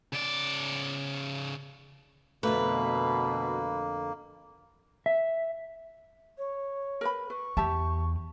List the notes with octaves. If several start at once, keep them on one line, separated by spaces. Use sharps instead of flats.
C#3 D5
F2 B2 D3 A3 A#3 B4
E5
C#5
A#4 B4 B5
B4 C#6
E2 G4 E5 A5